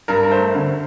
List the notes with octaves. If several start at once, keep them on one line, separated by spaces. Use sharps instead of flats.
G2 A#4
A#4
A3 C5
D3